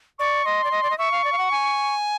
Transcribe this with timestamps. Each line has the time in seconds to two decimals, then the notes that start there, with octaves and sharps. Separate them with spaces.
0.19 D5 C#6
0.45 D#5 C6
0.64 D5
0.71 D#5
0.83 D5
0.90 D#5
0.98 E5 C#6
1.12 F5
1.24 D5
1.32 F5
1.38 F#5
1.51 G#5